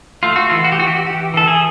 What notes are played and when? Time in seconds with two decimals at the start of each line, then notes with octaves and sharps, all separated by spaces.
0.23 A3 F4
0.36 F#4
0.49 E3 F4
0.64 F#4
0.72 G4
0.79 E3 F#4
0.87 G4
0.95 F#4
1.06 E3 G4
1.34 E3 A4
1.47 G#4